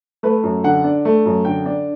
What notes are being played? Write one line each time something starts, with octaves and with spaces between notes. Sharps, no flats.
A3 B4
F#2
D3 F#5
D4
A3
F#2
D3 G5
D4